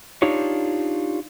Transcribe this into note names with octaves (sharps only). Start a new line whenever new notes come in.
D4 D#4 F4 G4 C#5